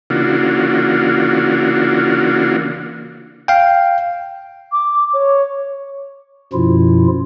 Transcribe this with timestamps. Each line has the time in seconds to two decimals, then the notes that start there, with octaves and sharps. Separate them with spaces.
0.10 C#3 E3 A#3 D4 F4 F#4
3.48 F5 G5
4.72 D6
5.13 C#5
6.53 F#2 B2 F3 E4 F4